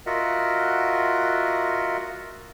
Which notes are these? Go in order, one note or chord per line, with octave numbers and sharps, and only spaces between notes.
F4 F#4 A#4 D#5 E5 F#5